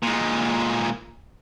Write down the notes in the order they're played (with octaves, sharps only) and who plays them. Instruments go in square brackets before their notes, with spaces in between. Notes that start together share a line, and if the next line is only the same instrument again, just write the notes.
[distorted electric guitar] A#2 G#3